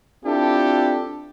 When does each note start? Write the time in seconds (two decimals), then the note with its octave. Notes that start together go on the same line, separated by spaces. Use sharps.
0.24 C4 D4 E4 F4 G4 A4